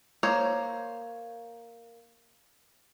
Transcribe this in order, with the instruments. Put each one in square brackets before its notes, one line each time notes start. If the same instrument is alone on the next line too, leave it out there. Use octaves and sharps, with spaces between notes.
[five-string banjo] A#3 C5 C#5